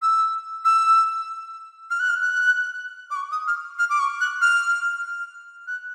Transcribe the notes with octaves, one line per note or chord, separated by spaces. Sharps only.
E6
E6
F6
F#6
F6
F#6
D6
C#6
D#6
F6
F6
D6
C#6
F#6
F6
F#6